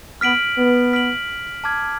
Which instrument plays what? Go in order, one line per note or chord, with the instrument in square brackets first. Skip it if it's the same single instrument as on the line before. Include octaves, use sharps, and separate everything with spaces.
[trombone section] B3 [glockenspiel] F6 B6 D7 F#7
[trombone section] B3
[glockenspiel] F6 B6 D7 F#7
A5 D6 F6 G#6